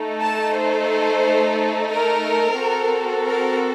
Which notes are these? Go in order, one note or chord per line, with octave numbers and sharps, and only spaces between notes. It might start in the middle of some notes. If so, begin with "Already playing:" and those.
Already playing: A3 D#4 A4
A5
C5
A#4
C4 F#4 A4
A#4